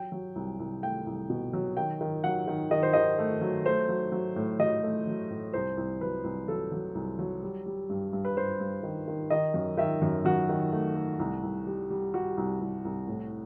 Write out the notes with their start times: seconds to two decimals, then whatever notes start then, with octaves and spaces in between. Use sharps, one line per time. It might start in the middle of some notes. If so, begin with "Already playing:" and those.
Already playing: F#3 G5
0.12 F#3
0.36 C2
0.60 C2
0.82 A3 G5
1.06 C2
1.30 B2
1.53 F#3
1.77 D#3 G5
2.01 D#3
2.24 F#3 F#5
2.47 D#3
2.71 D#3 D#5
2.83 C5
2.93 D#3 D#5
3.19 A3
3.41 F#3
3.65 A3 C5
3.89 F#3
4.12 F#3
4.36 A2
4.60 F#3 D#5
4.83 A3
5.07 F#3
5.30 A2
5.53 C2 C5
5.77 C2
6.01 F#3 B4
6.24 C2
6.48 F#3 A4
6.72 F#3
6.95 C2
7.19 F#3
7.43 G3
7.66 G3
7.90 G2
8.13 G2
8.25 B4
8.37 G2 C5
8.60 G2
8.83 D#3
9.08 D#3
9.30 D#3 D#5
9.54 F#2
9.77 D#3 E5
10.02 F#2
10.25 F#2 F#4
10.49 D#3
10.72 A3
10.95 A3
11.19 C2
11.43 C2
11.67 G3
11.90 G3
12.14 G3 F#4
12.37 C2
12.61 C2
12.85 C2
13.07 A2